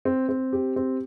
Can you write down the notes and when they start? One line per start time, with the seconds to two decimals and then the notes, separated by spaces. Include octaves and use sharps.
0.05 C4
0.29 C4
0.53 G4
0.76 C4